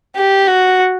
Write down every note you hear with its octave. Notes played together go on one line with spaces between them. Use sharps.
G4
F#4